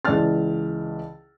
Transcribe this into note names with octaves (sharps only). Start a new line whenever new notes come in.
C#2 E3 D5 A5 F6 A6